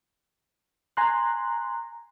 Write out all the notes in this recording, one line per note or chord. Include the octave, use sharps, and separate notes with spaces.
G#5 A#5 C6 F#6